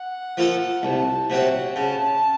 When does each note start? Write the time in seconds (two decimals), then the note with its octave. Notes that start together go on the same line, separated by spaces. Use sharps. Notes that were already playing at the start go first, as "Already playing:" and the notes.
Already playing: F#5
0.37 F3 A#3 F4 A4
0.83 C2 A5
1.30 C3 F#3 C4 F#5
1.76 C#3 A5